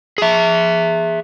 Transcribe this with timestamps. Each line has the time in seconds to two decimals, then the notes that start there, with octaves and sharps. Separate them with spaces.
0.18 G#4 E5